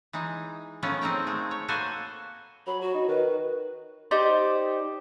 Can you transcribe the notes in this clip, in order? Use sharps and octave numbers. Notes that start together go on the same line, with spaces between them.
E3 G#3 D#4
D#3 F3 A3 B3 C#4
C4 D#4 G#4 A#4 G5
G#3 A3
C#5
A#3 F#4 A4 B4 C5 G#5
F#3 B5
F#4
D#4
D#3 B4
D#4 G4 C5 D5